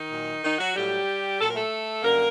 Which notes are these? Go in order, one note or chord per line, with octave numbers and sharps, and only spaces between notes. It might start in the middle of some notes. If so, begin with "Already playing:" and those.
Already playing: D#3 D#4
A#2 F#3
D#3 D#4
F#3 F#4
A2 F#3 G3 G4
A#2 F#3 A4
A#4
A3 A4
F#2 D3 G3 A#3 A#4